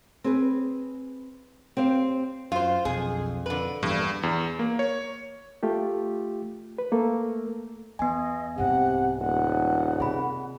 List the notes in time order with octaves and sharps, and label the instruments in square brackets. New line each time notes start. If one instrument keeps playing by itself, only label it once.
[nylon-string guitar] C4 G#4 B4
C4 G4 C5 F5
[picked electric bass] F#2 [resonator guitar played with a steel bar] F4 C5
[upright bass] B1 D4 [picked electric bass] F2 [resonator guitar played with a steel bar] G#4
[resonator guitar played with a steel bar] D3 B4 [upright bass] E4
[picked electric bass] A#1 E2 [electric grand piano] G2 [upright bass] E3 F3
[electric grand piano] E2
A#3
C#5
[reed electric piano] A3 F4 G4
B4
A3 A#3 A4
[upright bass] E2 [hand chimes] B3 G#5 [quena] D#5
[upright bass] C2 G#2 [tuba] C3 [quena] F#5
[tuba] D#1 [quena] F#5
[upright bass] C3 [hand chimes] G#4 B5